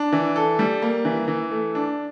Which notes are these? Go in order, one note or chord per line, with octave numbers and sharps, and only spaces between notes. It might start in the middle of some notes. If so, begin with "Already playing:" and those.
Already playing: D4
E3
A4
G3
A#3
E3
E3
A3
D4